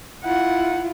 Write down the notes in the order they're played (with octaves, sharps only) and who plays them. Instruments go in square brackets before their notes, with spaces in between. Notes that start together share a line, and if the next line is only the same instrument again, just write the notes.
[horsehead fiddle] E4 F4 [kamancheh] F#5